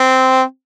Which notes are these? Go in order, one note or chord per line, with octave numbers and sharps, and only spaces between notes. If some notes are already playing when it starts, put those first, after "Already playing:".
Already playing: C4